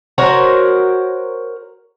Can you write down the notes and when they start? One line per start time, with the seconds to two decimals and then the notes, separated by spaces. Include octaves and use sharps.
0.18 F#4 A#4 C5 C#5